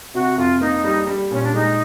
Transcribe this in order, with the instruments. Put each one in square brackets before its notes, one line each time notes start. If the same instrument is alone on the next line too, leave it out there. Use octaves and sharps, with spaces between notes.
[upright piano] C3 [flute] F#4
[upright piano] F2 [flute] F4
[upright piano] A#3 [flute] D#4
[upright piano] G3
G3
[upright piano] A#2 [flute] C#4
[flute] D4
[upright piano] G#3 [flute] D#4